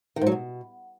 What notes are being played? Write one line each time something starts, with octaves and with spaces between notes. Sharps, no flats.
D#3
G#2
F#3
B2